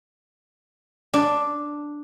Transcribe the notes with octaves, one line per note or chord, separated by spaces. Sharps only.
D4